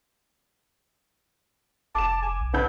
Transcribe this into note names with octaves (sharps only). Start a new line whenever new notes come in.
F1 A5 D6 E7
G#5
B1
D2 B4 A5 G6